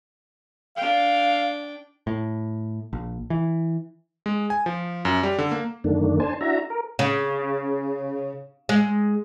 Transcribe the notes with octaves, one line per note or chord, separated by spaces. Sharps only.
D4 F5 G5
A2
A#1
E3
G#3
G#5
F3
F#2
G3
D3
A#3
F#2 D3 D#3 A3 A#3 D4
D4 C5 G#5 A5
D4 E4 F#4 E5 A#5
A#4
C#3
G#3